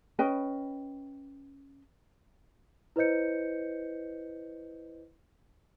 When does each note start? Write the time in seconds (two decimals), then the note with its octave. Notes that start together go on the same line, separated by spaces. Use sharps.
0.19 C#4 B4 D#5 G5
2.96 E4 B4 C5 D#5 G6 C#7